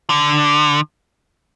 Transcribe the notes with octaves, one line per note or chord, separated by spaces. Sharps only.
D3